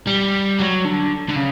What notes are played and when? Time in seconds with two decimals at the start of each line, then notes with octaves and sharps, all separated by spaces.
0.07 G3
0.59 F#3
0.85 D3
1.29 D3
1.36 C#3